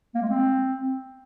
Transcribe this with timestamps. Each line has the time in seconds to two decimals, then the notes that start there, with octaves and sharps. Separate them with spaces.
0.15 A#3
0.22 G#3
0.30 C4